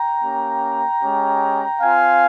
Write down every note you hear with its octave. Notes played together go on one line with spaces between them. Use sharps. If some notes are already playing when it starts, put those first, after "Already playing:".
Already playing: G5 A#5
A#3 C#4 G4
G#3 C#4 G4
C4 F4 F5 G#5